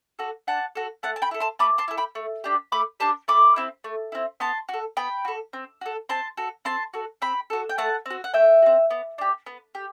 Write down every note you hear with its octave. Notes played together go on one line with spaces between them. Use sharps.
F#4 A4
D4 F#5 A5
F#4 A4
A3 F#5 A5
A5
G5 B5
E4 A4
A5 C6
A3 B5 D6
A5 C6
E4 A4
G5 B5
A3
D4 G4
A3 B5 D6
D4 G4 A5 C6
A3 B5 D6
C4 E4
A3
C4 E4
B3 A5 C6
F#4 A4
B3 G5 B5
F#4 A4
C4
F#4 A4
C4 A5 C6
F#4 A4
C4 A5 C6
F#4 A4
C4 G5 B5
F#4 A4
G5
A3 F#5 A5
C4 F#4
F#5
A3 E5 G5
C4 F#4
B3
D4 G4
B3
G4